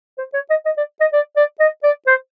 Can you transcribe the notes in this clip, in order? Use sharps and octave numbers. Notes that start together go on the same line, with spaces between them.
C5
C#5
D#5
D#5
D5
D#5
D5
D5
D#5
D5
C5